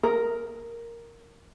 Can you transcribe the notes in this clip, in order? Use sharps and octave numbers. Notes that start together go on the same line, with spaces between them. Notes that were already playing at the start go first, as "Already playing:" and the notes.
A#4